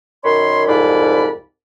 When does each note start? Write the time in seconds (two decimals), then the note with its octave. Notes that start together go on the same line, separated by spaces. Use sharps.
0.24 F#2 D#3 C#5 B5 C6
0.68 C2 F2 G#2 D5 B5